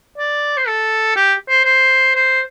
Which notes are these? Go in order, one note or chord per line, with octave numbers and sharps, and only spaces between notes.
D5
C5
A4
G4
C5
C5
C5